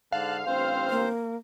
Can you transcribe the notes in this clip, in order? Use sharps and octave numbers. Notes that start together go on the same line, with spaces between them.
G#2 D3 F5 A5 F#6
A1 G2 C4 C5
A#3